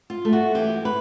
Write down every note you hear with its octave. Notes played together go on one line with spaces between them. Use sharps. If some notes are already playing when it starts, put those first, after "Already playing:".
F4
A3
F#4
E3 G4
B4